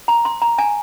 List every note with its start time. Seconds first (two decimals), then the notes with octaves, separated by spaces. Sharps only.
0.08 A#5
0.25 C6
0.42 A#5
0.58 G#5